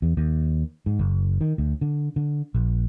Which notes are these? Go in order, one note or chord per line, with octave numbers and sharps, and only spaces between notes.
E2
D#2
G#2
F#1
D#3
D2
D3
D3
A#1